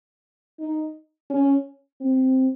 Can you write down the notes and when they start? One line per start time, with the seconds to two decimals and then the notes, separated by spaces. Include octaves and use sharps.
0.59 D#4
1.30 C#4
2.01 C4